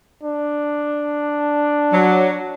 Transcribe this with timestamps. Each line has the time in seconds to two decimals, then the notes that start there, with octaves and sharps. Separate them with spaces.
0.23 D4
1.93 F#3